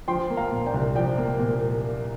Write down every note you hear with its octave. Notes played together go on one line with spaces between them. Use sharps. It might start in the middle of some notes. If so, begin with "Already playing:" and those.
F3 G5 C6
A#3
F5 A#5
A#2
D5 G5
C2
F3 D5 G5
A#3
A#2